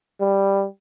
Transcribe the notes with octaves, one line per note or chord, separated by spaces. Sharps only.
G3